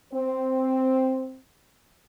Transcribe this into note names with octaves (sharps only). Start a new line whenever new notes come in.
C4